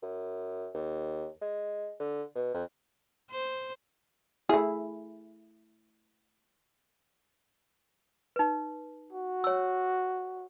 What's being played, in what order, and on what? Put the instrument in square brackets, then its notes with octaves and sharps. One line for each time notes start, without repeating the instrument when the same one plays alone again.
[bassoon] F#2
D#2
G#3
D3
B2
F2
[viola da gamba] C5
[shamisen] A3 G#4 [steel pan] E4
[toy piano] D#4 B4
[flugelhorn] F#4
[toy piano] C#5 E6